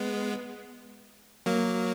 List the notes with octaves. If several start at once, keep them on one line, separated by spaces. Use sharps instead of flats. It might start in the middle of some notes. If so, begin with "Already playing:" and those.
Already playing: G#3 B3
F#3 A#3